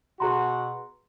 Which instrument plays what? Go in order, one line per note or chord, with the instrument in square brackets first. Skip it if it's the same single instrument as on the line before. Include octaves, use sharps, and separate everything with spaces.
[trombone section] B2 F#4 [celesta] G#4 A#5 C6